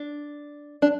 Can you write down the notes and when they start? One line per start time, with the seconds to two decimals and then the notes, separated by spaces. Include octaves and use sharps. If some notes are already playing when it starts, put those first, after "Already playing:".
Already playing: D4
0.82 D4